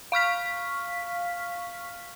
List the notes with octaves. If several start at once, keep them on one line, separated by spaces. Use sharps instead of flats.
F5 C#6 F6 B6